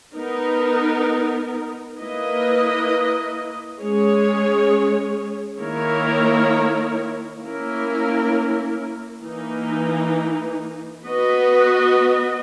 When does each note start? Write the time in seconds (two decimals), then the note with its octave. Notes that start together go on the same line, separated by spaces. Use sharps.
0.16 B3 D#4 A#4
1.98 A#3 E4 B4 D#5
3.79 G#3 C#4 G#4 C#5
5.59 D#3 A#3 E4 A#4 C#5
7.40 A#3 C#4 E4 A#4
9.22 E3 A#3 D#4
11.03 B3 F#4 B4 D#5